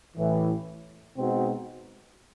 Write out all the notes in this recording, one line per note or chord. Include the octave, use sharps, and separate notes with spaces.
A1 A2 E3
B2 G#3 C4 D#4 F#4